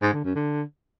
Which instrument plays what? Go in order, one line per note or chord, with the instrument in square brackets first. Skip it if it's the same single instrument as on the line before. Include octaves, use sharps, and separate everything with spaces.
[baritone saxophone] G#2
D3
F#2
D3